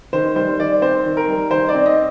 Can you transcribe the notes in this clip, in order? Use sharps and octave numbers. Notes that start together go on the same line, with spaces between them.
D#3 C5
G3 C5
D#3 D5
C4 C5
D#3
A#4
G3
D#3 C5
D5
C4
D#5